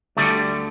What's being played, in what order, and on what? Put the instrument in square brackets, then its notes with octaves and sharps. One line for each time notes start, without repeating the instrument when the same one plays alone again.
[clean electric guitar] D2 D3 G3 A3